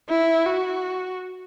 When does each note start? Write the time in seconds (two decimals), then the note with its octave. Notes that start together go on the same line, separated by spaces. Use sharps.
0.10 E4
0.46 F#4